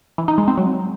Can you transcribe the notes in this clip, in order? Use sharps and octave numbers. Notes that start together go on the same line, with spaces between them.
E3
D#4
G#3
C4
F#3